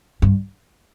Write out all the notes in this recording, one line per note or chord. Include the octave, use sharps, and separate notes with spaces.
G2